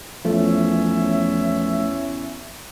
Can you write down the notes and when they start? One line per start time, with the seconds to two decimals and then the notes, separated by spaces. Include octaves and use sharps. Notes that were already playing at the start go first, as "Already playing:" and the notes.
0.25 E2 F3 A3 C#4 E5